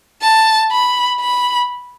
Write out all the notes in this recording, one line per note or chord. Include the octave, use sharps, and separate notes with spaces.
A5
B5
B5